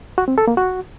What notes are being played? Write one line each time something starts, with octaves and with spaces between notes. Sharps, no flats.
F#4
C4
A4
A#3
F#4